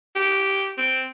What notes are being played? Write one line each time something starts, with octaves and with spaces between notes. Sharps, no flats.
G4
C4